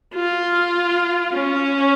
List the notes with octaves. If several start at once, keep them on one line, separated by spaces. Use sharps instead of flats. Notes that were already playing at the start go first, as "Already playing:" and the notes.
F4
C#4